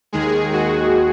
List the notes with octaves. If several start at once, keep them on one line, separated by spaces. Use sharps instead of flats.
D#2 D#3 G#3 G#4
F#4